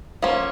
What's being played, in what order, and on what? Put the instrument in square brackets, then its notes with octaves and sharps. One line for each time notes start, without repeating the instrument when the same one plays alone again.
[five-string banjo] F3 A#3 C#4